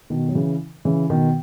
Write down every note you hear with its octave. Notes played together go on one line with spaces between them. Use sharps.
B2 D#3
F#3
C#3 E3
C#3 E3
B2 D#3